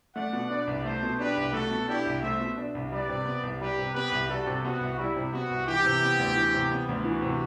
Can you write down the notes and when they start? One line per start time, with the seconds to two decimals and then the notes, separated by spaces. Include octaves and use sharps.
0.15 A3 D5 F#5
0.33 B2
0.50 D4 B4 D5
0.67 C2
0.85 A3 A4 C5
1.03 B2
1.19 D4 G4 B4
1.37 C2
1.53 A3 F#4 A4
1.71 B2
1.88 D4 E4 G4
2.06 C2
2.22 A3 C5 E5
2.40 B2
2.57 D4
2.75 C2
2.91 G3 B4 D5
3.09 C3
3.25 B3
3.43 C2
3.60 G3 G4 B4
3.78 C3
3.95 B3 G4 B4
4.12 C2
4.29 G3 F#4 A4
4.47 C3
4.64 B3 F#4
4.81 C2
4.98 G3 E4
5.16 C3
5.33 B3 F#4
5.51 C2
5.67 E3 E4 G4
5.85 C3
6.02 B3
6.19 D2
6.36 E3
6.54 C3
6.71 B3
6.89 D2
7.05 E3 F#4
7.22 C3